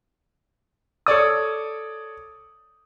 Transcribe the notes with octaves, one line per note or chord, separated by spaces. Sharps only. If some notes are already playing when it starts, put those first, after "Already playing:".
A4 C#5 D5 D#6